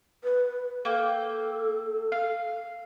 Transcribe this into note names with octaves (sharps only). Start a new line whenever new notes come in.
B4
A#3 A4 G5
F5